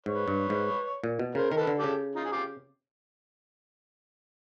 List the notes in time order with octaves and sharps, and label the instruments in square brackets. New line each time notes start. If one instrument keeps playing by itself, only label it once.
[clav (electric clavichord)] G#2 [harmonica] B4 C#5
[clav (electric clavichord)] G2
G#2
A#2
B2
[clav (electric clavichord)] C#3 [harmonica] A#4 C5
[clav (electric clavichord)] D#3 [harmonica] A#4
[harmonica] A4 B4
[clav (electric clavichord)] D3
[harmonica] G4 A4
[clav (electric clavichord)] C#3
[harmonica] D#4 F4
G#4
F4 G4